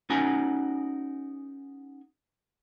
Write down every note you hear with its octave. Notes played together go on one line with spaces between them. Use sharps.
C#4 D#4 F#4 A#4 G#5